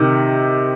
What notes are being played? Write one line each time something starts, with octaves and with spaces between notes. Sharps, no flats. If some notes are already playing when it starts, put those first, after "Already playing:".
Already playing: C3 D#3